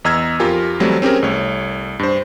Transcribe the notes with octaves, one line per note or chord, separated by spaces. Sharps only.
E2 D#5 A#5 E6 F6 G#6
F2 F4 G4 A#4 G#5
E3 F#3 G3 A3 C4 E4
C4 C#4 G4 G#4 A#4
C2 A3 C#5
G2 C5